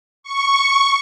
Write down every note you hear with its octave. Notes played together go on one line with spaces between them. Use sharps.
C#6